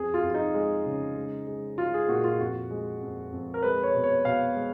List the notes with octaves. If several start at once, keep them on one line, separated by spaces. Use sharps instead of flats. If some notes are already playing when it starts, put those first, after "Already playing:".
Already playing: F2 G#4
F4
F2
F4
D#4
G#3
C#3
G#3
G#3
G#3 F4
G#4
A#2 F#4
F4
F2 F#4
G#3
F2
F2
A#4
G#3 B4
C#5
B2
C#5
B2 F5
G#3